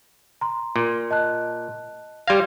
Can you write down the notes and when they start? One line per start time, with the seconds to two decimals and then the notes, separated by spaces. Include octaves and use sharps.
0.41 A#5 C6
0.76 A#2
1.11 D#5 A5 F#6
2.27 G3 F5 C6 G#6 A#6